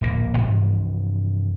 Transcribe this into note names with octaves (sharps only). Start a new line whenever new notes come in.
D1 A#1 A#2 A#3
G2 C3 E3 F3